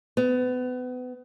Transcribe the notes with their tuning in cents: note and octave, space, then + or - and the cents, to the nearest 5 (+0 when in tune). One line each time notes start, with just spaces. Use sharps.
B3 +30